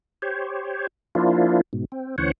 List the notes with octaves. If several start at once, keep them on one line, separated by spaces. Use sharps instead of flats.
G4 C5 C#5
F3 A#3 D4 E4 F4
G#2 B2
C4
D2 E3 C#4 C5 C#5 F#5